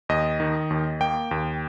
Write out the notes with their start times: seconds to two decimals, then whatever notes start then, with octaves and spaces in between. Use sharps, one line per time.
0.09 D#2 D#5
0.40 D#3
0.70 D#2
1.01 A#3 G5
1.31 D#2